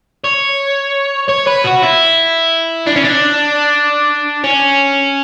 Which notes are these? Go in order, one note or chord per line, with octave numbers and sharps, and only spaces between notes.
C#5
C#5
B4
F#4
E4
D4
C#4
D4
C#4